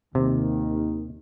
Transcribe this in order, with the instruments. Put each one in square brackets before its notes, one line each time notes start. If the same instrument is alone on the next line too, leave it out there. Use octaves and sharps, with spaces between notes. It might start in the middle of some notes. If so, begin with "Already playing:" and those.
[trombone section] D#2 D#3 [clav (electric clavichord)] C3